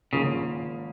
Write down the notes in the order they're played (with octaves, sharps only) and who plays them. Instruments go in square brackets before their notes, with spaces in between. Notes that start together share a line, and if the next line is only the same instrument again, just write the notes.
[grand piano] G#1 G#2 F3 A#3 F4 [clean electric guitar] C#3